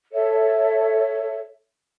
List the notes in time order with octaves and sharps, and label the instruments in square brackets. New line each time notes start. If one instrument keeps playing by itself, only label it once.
[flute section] A4 C#5 E5